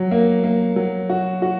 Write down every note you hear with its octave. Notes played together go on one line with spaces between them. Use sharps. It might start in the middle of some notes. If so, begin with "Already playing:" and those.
Already playing: F#3
A#3
A#3
F#3
F#4
F#4